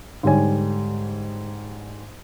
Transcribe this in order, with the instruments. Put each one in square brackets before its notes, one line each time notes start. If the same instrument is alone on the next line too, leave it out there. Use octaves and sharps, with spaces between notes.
[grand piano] G#2 D3 G3 C#5 G#5